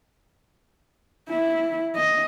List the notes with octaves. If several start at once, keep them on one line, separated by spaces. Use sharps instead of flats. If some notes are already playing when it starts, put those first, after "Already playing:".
E4
D#5